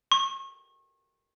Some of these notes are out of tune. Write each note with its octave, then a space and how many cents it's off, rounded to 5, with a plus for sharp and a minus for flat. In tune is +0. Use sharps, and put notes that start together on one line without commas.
C#6 -35